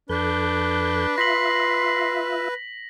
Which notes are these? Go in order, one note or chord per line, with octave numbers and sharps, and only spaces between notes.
F2 D4 A4 B4 G6
F4 E5 C6 A#6 B6 F#7